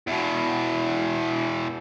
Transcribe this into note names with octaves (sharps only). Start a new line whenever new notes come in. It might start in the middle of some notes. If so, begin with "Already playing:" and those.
E2 B2